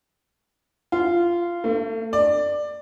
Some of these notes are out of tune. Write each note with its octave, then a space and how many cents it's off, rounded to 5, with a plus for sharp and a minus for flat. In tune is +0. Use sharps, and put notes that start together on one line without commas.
F4 -15
A3 +35
D5 +15